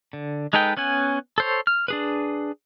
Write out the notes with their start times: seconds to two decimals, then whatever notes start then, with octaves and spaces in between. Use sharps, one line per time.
0.13 D3
0.53 G#3 D#4 A4 B4 G5
0.77 B3 C#4 F#5 G#5
1.38 A4 C5 C#5
1.67 F6
1.88 D4 G#4 B4